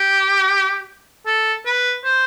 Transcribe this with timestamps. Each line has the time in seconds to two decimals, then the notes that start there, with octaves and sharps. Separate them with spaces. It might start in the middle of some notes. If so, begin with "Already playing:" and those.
Already playing: G4
1.26 A4
1.66 B4
2.04 C5